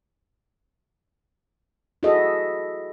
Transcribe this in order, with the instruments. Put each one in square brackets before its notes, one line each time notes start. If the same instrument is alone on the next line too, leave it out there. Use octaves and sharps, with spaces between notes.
[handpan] E4 F#4 G#4 A4 D#5 E5